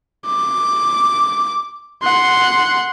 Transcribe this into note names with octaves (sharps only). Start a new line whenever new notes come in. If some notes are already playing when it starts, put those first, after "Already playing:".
D6
F#5 C6